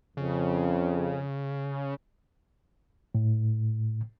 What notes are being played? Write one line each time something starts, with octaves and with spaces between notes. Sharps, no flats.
F2 C#3
A2